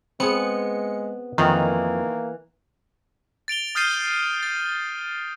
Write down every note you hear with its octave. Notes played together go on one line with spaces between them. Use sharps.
G#3 B3 C4 G#4 C#7
F2 D#3 E3 A#3
A6 D7 F7 G7
D#6 F6 G6 A6 C7 D#7
A6